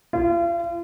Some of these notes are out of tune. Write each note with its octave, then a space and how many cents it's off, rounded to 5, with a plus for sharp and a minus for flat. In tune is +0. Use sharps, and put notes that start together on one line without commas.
F4 -40